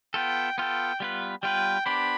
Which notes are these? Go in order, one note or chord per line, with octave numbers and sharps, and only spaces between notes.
B3 F4 A4 G5
B3 F4 A4 G5
G3 B3 F4 B4
G3 B3 F4 B4 G5
B3 D4 G4 C5 B5